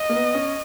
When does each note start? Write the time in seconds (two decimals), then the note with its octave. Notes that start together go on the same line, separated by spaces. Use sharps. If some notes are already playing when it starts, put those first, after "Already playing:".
Already playing: D#5
0.09 A#3
0.15 B3
0.34 C#4